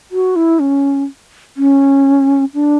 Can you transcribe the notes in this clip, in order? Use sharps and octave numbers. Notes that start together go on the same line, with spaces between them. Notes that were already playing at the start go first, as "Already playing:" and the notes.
F#4
E4
C#4
C#4
D4